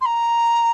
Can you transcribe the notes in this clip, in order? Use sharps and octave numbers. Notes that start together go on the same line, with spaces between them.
C6
A#5